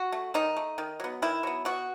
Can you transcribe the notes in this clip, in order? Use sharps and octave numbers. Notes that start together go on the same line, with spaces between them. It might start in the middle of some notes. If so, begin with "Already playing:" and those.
Already playing: F#4
A3
D#3 D#4
A3
D#3
F#3 B3
D#3 E4
F#3 B3
B2 F#4